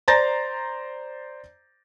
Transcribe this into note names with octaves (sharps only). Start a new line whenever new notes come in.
C5 D5 A#5 G6 A6 A#6